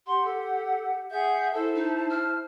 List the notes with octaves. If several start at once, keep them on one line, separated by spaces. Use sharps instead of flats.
G4 F#5 C6
A4
G#4 E5 F#5 G6
E4 A4 C5 A5
D#4
F6